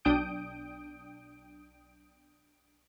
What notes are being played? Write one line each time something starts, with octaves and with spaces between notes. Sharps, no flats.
B1 D4 G5 D#6 G6 D7